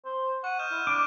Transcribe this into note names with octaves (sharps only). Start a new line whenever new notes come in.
C5
F#5 C#6 D#7
D#5 F6 G6 E7
E4
D4 D6